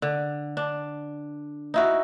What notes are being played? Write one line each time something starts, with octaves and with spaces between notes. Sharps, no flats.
D3
D4
D#4 E4 F#4